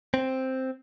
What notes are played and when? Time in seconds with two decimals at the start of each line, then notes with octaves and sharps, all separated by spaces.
0.14 C4